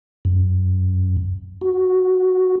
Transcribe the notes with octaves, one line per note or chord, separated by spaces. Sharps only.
F#2
F#4